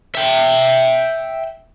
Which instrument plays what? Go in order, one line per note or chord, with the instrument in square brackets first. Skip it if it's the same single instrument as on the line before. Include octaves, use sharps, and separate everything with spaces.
[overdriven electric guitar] E5 G5